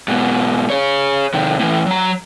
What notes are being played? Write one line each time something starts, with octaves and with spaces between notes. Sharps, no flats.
G#2 B2
G#4 C#5
C3 D#3
A2 E3
F#3 A#5